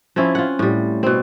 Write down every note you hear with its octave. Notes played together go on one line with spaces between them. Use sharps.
F3 C4 C#4 E4
F4 F#5
A2 G3
B2 C4